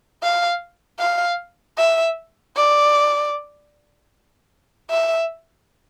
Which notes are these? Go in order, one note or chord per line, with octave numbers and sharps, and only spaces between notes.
F5
F5
E5
D5
E5